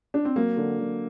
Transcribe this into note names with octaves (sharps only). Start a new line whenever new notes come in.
D4
C4
F#3 A#3
D3
D3